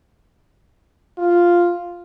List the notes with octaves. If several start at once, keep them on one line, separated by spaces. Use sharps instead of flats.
F4